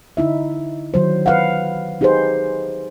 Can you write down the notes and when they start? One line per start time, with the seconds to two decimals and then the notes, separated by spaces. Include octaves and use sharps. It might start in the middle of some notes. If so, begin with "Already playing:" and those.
0.17 D3 D#4 E4 E5
0.94 D#3 F#3 C5
1.26 B4 F5 F#5
2.01 D#4 G4 G#4 B4 C5